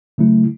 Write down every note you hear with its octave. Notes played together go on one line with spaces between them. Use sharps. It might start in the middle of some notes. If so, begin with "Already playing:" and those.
C#3 F#3 A3 E4